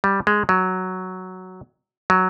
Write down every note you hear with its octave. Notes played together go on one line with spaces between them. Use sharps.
G3
G#3
F#3
F#3